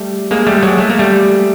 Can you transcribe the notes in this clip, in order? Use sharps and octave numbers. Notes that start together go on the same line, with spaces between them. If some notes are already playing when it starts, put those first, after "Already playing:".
Already playing: G3 A3
G#3 A#3
G3 A3
F#3 G#3
A3
A#3
G3 A3